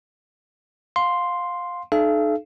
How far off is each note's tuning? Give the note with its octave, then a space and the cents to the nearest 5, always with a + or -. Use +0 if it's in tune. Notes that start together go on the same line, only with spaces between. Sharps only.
F5 +20 C6 +0
D#4 -40 A4 -40 F5 -45